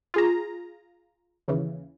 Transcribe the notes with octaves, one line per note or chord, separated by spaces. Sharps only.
F4 G#4 A#5
D#2 C#3 E3